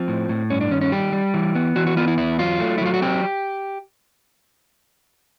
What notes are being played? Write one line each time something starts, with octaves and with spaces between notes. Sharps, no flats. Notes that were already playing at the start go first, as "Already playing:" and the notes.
Already playing: F3 C4
A2
A2
G2 C#4
D4
D#3 C#4
C#4
G3 G4
G3
E3
B3
E3 F#4
F#4
B3 F4
E4
E2 E4
F#3 F4
A3
E4
F#3 F4
F#4
C4 G4